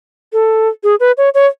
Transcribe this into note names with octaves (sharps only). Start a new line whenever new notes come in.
A4
G#4
B4
C#5
C#5